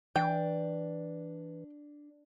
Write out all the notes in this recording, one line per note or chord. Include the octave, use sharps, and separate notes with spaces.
E3 D4 G5